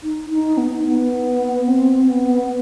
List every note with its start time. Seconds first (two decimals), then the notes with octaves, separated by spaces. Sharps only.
0.03 D#4
0.30 D#4
0.57 B3
0.85 B3
1.68 C4
2.09 B3